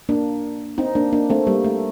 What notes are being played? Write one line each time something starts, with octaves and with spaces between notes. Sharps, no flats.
A#3 D4
C4 D#4
A#3 D4
A#3 D4
A3 C4
G3 A#3
A3